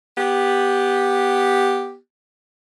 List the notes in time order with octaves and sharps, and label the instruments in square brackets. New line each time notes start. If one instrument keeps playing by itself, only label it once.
[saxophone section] B3 G4